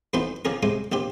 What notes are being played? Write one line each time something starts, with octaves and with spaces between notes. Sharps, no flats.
F2 B2 E3 D#4 C5 C6
C#3 F3 D4 G#4 A#4
C3 G#3 C5 D#6
A#1 A#2 G4 C5